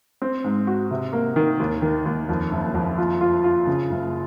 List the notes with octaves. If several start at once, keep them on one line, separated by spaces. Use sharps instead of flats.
C4
G#2
F#4
C3
A#3
D#3
D#2
D#3
D#2
F2
F#1
F2
F4
F4
F4
C#3
F#1